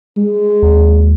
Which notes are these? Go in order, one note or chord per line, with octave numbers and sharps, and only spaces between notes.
G#3
D#2